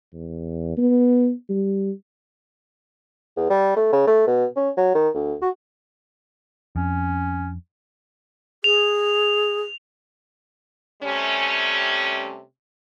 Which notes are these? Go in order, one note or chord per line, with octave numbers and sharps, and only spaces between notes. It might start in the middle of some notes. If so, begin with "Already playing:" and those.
E2
B3
G3
E2
G3
A3
C#3
A3
B2
C#4
F#3
D#3
D2
F#4
F2 C#4
G#4 F7
C3 G3 A3 C#4